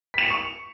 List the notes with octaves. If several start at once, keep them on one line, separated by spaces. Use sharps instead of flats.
C#6 B6 C#7 E7 F7